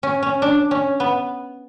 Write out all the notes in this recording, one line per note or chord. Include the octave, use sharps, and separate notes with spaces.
C#4
C#4
D4
C#4
B3